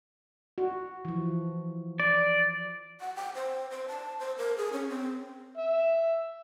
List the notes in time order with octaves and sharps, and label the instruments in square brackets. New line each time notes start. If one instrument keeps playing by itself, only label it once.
[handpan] F#4
E3 F3
[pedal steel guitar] D5
[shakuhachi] F#5
G5
C5
C5
A5
C5
A#4
G#4
C#4
C4
[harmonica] E5